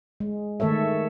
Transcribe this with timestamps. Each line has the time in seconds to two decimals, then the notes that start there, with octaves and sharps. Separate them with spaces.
0.20 G#3
0.60 D#3 A3 A4 C#5 E5